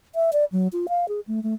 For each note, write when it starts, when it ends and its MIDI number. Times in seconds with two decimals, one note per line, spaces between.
0.15 0.30 76
0.33 0.45 74
0.52 0.68 54
0.73 0.87 65
0.89 1.08 77
1.08 1.20 68
1.27 1.42 57
1.43 1.54 57